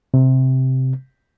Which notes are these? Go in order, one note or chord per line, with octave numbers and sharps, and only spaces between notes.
C3